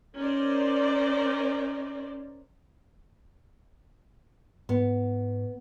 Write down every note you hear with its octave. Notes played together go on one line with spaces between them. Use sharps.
C#4 D#4 A#4 C5 D5
G#2 B3